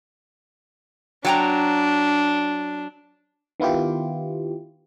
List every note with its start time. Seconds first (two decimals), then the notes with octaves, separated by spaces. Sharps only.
1.25 F#3 D4 G5 A#5
3.60 D#3 B3 E4 F4 G4